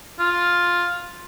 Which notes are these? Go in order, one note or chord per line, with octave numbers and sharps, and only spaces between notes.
F4